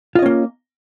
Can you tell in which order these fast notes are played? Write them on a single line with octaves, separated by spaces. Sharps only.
F4 D#5 C#4 A#3